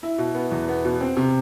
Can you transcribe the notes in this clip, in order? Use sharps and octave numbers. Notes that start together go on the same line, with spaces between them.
E4
B2
B3
E2
B3
B2
C4
C3